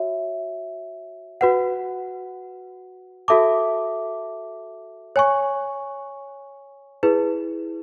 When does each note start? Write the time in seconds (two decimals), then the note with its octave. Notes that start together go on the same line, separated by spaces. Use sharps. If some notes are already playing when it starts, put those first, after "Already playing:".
Already playing: F#4 C#5 E5
1.41 F#4 B4 F#5
3.28 F#4 A4 E5 A5 D6
5.16 C#5 G#5 C#6
7.03 E4 G#4 B4